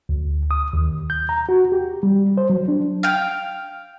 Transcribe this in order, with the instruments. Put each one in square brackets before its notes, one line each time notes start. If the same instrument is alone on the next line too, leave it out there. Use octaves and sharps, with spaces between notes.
[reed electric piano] D2
D#6
D#2
G6
A#5
F#4
G4
G3
C5
F#3
D4
[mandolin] F5 G5